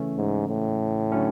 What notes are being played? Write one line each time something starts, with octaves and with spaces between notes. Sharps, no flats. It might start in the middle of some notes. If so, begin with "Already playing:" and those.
Already playing: C#3 E3 A3 C#4
G#2
A2
D3 F#3 A3 C#4